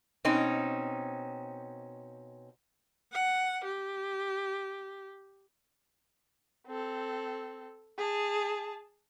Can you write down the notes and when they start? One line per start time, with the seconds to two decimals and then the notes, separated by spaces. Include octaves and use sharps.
0.25 B2 C4 C#4 D#4
3.12 F#5
3.64 G4
6.67 C4 A4
7.98 G#4 A5